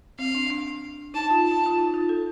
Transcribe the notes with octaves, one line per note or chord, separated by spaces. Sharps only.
C4 F5
D4
D4
D#4 A5
F4
A5
F4
D#4
F4
A4